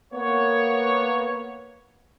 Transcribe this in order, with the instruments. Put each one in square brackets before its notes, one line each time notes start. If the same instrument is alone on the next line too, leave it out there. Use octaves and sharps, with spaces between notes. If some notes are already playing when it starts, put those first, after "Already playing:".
[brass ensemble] A#3 B3 C#5